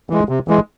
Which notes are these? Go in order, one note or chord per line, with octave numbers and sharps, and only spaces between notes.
E3 G#3
C3
E3 G#3